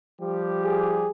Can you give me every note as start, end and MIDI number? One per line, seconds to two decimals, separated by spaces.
0.21 1.07 53
0.21 1.07 55
0.21 1.07 67
0.64 1.11 68